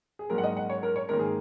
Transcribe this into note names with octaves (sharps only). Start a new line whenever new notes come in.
G#4
G#2 F#3 A#3 A#4
F#5
D#5
F#5
C#5
A#4
C#5
G#2 D#3 A#3 A#4
G#4